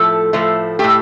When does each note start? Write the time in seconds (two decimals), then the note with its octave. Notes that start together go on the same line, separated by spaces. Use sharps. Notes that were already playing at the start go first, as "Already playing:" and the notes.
Already playing: A2 F3 A3 A4
0.33 A2 F3 A3
0.79 A2 A3 G4